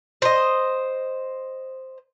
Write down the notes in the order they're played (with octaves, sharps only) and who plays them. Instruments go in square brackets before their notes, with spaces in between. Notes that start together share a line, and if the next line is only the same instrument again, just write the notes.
[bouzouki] C5 D#5